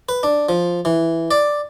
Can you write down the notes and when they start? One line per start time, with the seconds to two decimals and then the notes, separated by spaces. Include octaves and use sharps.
0.09 B4
0.23 D4
0.49 F3
0.85 E3
1.31 D5